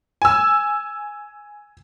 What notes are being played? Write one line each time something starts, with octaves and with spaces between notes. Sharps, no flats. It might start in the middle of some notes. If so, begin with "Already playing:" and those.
G#5 E6